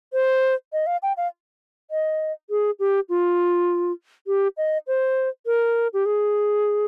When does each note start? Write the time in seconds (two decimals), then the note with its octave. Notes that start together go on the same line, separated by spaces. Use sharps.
0.13 C5
0.73 D#5
0.87 F5
1.03 G5
1.17 F5
1.91 D#5
2.50 G#4
2.79 G4
3.09 F4
4.27 G4
4.57 D#5
4.87 C5
5.46 A#4
5.94 G4
6.06 G#4